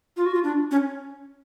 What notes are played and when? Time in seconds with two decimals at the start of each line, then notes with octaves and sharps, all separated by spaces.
0.17 F4
0.26 F#4
0.34 F4
0.44 D4
0.71 C#4